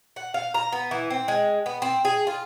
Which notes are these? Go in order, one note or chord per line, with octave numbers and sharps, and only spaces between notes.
F#5
F5
A#5
B3
E3
C4
G#3
B3
C4
G#4
F4